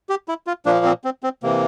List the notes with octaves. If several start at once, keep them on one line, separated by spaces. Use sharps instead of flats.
G4
E4
F4
A#2 F3 A#3 D4
C4
C4
C4
C3 E3 A#3